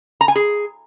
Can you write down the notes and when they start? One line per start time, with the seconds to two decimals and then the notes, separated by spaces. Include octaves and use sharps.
0.21 A#5
0.28 G#5
0.36 G#4